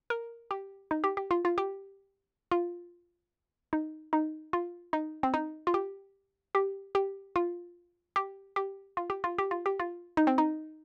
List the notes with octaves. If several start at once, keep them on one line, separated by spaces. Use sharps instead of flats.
A#4
G4
D#4
G4
G4
F4
F4
G4
F4
D#4
D#4
F4
D#4
C4
D#4
F4
G4
G4
G4
F4
G4
G4
F4
G4
F4
G4
F4
G4
F4
D#4
C4
D#4